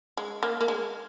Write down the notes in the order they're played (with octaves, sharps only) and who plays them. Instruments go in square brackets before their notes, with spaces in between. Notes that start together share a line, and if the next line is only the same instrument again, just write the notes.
[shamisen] G#3
A#3
A#3
G#3